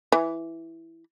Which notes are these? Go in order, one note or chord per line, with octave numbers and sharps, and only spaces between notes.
E3